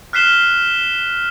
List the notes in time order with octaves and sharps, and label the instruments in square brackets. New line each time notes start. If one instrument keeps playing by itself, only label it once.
[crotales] F6 F#6 B6 C7 E7 G7